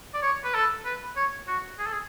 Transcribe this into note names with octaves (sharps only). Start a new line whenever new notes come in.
D5
C#5
B4
A4
B4
C#5
F#4
G#4
A4
G#4